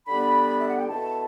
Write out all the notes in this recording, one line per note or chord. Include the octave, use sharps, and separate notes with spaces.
D3 G3 B3 D4 B5
E5
F#5
G5
B2 A3 E4 A5